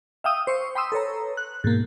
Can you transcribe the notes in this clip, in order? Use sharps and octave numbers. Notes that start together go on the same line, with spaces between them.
E5 F5 G5 D#6 E6
C5 C#6
G5 B5 C6 D#6 E6
A4 B4 C#5 A#5
F#6
G#2 B2 A#3